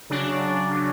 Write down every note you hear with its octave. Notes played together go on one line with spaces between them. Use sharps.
C#3 F#3 D4
C#3 F#3